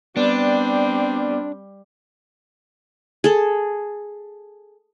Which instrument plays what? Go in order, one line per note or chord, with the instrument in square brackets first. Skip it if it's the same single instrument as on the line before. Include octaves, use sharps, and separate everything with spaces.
[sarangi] G3 [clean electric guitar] B3 [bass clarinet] C4 [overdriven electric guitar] D4
[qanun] G#4 A4